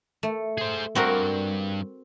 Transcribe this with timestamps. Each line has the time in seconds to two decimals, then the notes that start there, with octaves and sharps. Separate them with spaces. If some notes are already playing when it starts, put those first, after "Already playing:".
0.23 A3
0.58 G#4 C5
0.95 G2 C4 F#4 A#4